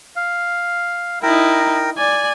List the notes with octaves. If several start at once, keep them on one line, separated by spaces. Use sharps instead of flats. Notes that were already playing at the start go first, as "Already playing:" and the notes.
F5
D#4 E4 A#4 G5
D5 G#5